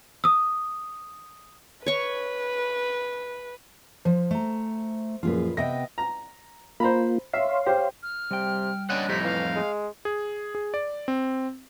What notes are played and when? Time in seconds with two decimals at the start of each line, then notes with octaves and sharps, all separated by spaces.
0.24 D#6 E6
1.86 B4 C#5 C#6
4.05 F3 C5
4.31 A3 A#5
5.23 F#2 A#2 F3 F4 G#4 B4
5.57 C3 B3 D#5 E5 G5 A#6
5.98 A#5
6.80 A#3 F4 C5 A#5 B5
7.34 C#5 E5 F5 C6
7.66 G4 C5
8.03 F6
8.31 C3 G3 G5
8.90 C#4 D4 D#5 F#5
9.09 F2 A2 C3 D#4 B6
9.23 E3 F5
9.56 G#3
10.05 G#4
10.55 G#4
10.74 D5
11.08 C4